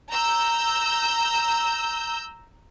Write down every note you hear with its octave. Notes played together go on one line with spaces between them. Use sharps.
A#5 E6 G6